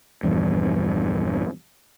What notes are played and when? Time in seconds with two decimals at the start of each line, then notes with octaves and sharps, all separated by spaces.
0.23 A#1 E2 G2